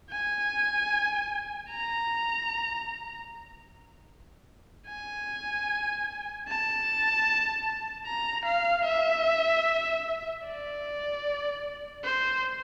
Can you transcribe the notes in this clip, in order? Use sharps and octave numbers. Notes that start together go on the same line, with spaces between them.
G#5
A#5
G#5
A5
A#5
F5
E5
D5
C5